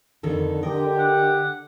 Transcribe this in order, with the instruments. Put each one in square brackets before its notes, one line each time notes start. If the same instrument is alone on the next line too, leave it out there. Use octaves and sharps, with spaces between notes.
[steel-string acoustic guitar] F2 D#3 A4 [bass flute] D3
[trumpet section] G4 [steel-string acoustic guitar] A#4 D#5
[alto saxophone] F#5